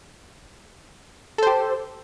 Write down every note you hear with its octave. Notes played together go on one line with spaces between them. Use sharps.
G4 A4 C5